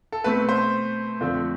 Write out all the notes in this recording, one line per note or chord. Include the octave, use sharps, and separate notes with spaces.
A4
B2 A3 C4 B4
C5
F2 D3 F3 A3 C4